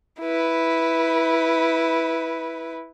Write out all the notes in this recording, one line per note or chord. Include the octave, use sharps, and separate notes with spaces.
E4 B4